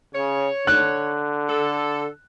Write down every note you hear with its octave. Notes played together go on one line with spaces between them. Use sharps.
C#3 C#5
D3 F#6
A4